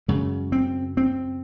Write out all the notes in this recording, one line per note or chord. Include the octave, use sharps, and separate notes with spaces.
F#2 C#3 G#3
C4
C4